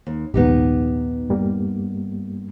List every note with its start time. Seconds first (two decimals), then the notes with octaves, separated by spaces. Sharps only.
0.07 D#2
0.34 A#1 D#2 G#2 B3 D#4 G4
1.30 G2 G3 A#3